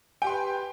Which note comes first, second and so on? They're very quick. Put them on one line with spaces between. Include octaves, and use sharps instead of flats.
G5 G4 C6 B4